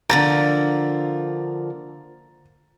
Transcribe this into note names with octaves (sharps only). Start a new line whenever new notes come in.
D3 F3 A#3 A#5 A6